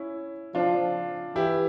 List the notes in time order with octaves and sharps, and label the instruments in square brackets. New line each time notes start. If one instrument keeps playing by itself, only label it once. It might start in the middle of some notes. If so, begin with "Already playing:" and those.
Already playing: [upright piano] C#4 E4
[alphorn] F3 [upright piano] D4 F4
[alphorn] E3 [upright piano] E4 G4